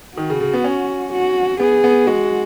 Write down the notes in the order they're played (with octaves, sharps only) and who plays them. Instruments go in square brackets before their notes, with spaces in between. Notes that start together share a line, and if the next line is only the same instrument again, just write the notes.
[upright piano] D#3 [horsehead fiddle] F#4
[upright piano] C#3
C#3
B3
C#4
[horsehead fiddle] F#4
[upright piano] B3 [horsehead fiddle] G#4
[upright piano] B3
[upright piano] G#3 [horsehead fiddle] F#4